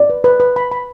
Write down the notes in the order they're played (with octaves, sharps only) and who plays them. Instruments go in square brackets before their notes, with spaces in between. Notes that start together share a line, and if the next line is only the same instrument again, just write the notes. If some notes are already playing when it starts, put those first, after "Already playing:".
Already playing: [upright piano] D5
[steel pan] B4
B4
B4
B5
B5